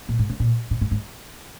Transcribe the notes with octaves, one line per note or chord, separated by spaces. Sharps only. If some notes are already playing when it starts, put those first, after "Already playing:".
A#2
G#2
C#3
A#2
A#2
G#2
G#2